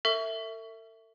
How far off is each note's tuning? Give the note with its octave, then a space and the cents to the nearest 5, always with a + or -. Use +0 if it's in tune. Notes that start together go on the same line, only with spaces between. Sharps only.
A4 +45 E5 +0 C#6 +25